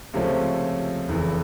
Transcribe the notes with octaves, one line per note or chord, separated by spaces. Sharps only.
C#2 C3 F3 A3 C#4
F1 E2 C#3 E3